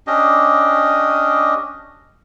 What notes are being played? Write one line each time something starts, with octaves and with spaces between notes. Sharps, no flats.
C#4 D4 G4 D#5